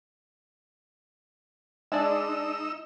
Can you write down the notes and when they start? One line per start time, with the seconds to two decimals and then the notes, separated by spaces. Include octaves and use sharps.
1.92 G#3 D4 D#4 D5 E6